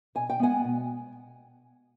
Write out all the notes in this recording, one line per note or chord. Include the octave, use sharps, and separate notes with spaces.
B2 G#5
G5
G#3 B3 F#5 G#5
B2